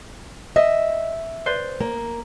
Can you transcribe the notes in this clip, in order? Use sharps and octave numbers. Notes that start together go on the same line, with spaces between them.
D#5 E5
B4 C5 D5
A#3